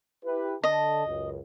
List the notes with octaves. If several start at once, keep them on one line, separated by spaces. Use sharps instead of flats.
E4 G4 B4
D3 D#5 A5
C#2 F#2